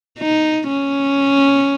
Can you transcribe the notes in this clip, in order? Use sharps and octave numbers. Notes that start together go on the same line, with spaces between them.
D#4
C#4